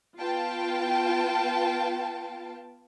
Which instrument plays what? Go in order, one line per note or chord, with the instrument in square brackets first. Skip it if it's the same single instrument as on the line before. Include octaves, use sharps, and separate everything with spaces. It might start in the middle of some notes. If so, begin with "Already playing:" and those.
[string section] B3 F4 B4 F5 G5 A5